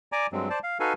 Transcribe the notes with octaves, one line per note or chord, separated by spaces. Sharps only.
D5 G#5 A#5 D6
G2 F#3 G#3 C4
C5 D5 A5
F5
D#4 F#4 A4 B4 F5 G#5